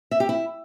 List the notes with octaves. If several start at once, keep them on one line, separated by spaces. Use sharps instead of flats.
E5
G4
E4